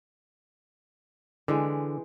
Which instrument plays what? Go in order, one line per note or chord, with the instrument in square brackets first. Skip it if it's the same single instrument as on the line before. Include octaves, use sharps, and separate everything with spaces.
[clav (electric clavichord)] D3 [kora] E3 G#3 G5